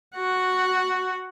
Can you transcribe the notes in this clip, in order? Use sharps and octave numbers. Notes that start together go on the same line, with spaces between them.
F#4 F#5